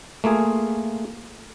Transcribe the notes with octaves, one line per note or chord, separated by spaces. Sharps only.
A3 A#3 F4 G#4